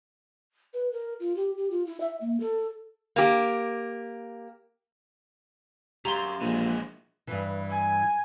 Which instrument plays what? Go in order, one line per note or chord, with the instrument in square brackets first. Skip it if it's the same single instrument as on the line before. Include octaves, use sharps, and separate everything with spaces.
[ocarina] B4
A#4
F4
G4
G4
F4
E4
E5
A#3
A4
[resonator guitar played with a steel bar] A#3 G4
[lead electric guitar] F#2 [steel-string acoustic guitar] G4 F5 [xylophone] A#5 C6
[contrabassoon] A#1 [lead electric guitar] E3 G#3
[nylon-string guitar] G2 E3
[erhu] G#5